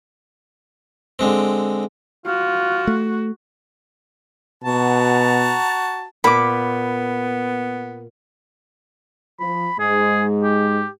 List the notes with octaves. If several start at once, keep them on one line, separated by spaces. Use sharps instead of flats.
D3 G#3 C4
F4 F#4
A3
B2 F#4 A5 A#5
A#2 B3 B5 D6
F3 B5
G#2 G#3 G#4
G4